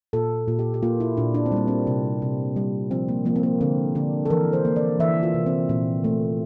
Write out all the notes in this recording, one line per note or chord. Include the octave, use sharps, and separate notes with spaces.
A#2 A4
A#2
G4
G4
A#3 F4
E4
A#2 D4
D4
C4
G3 A#3
C4
C3
C3
G3
F3 C4
A#3
F3 A#3
C4
A#3
D3 C4
D3 D4
A4
E3 A#4
C5
A#3
D5
E3 E5
F4
C3
C4
A#2 C4
A3